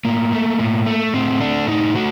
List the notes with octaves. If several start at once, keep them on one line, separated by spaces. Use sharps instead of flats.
A2 A#3
A3
A2
A3
A2 C4
A3 D4
A2 D#4
A3 F#4